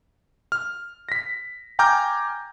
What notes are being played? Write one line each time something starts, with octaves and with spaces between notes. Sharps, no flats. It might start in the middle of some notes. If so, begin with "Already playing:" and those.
F6
A#6 B6
G5 G#5 A#5 D6 F6 G6